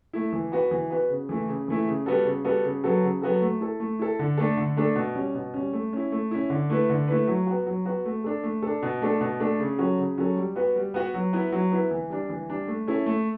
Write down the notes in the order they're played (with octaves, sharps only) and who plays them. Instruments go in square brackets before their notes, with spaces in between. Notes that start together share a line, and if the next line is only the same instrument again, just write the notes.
[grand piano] A3 E4
E3
B3 F#4 B4
E3
B3 F#4 B4
C#3
E3 A3 E4
C#3
E3 A3 E4
C#3
G3 B3 F#4 A4
C#3
G3 B3 F#4 A4
C#3
F#3 B3 F#4 A4
C#3
F#3 B3 F#4 A4
A3
E4 A4
A3
E4 A4
D3
A3 D4 A4
D3
A3 D4 A4
B2
G3 C#4
B2
G3 C#4
A3
C#4 E4
A3
C#4 E4
D3
A3 E4 B4
D3
A3 E4 B4
F#3
B3 F#4
F#3
B3 F#4
A3
D4 A4
A3
D4 A4
B2
A3 D4 A4
B2
A3 D4 A4
C#3
F#3 C#4 F#4 A4
C#3
F#3 C#4 F#4 A4
G3
B3 F#4 B4
G3
B3 F#4 B4
F#3
B3 E4 B4
F#3
B3 E4 B4
E3
G3 D4
E3
G3 D4
A3
C#4 E4 A4
A3